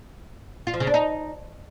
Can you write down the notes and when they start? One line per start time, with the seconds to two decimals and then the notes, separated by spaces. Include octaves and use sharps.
0.67 F4
0.74 F3
0.80 C#3
0.87 D4
0.94 D#4